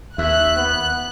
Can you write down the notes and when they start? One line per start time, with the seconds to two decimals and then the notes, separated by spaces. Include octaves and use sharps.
0.18 D#2 E5 F#6
0.56 B3